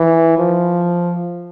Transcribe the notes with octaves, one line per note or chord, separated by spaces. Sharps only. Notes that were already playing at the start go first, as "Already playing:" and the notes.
Already playing: E3
F3